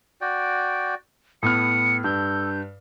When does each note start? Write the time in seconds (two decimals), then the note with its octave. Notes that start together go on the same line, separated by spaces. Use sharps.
0.21 F#4 D5 G5
1.43 A2 B3 D#6 F6 C#7
2.04 G2 A4 G6